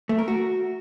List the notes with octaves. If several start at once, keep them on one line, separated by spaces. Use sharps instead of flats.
A3
A#4
F#4